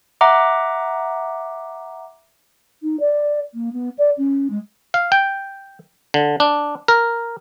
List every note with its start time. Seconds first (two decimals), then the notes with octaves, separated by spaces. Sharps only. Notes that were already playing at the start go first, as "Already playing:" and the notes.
0.21 E5 F#5 A#5 D6
2.81 D#4
3.00 D5
3.54 A#3
3.72 B3
3.98 D5
4.17 C#4
4.50 G#3
4.94 F5
5.12 G5
6.14 D3
6.40 D4
6.88 A#4